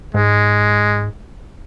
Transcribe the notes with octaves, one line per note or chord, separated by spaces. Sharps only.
G#2 G#3